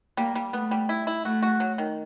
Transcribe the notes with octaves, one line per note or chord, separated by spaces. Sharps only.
G3 A#3
G3
A3 B3
G3
E4
E4
A3 F#4
F#4
F#3
D#3